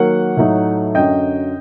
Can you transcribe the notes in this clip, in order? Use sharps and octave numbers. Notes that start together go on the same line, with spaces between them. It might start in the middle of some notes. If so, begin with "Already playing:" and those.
Already playing: D#3 F#3 A#3 F#5
A2 F#3 A3 D#4
F#2 D3 F#3 D#5 G5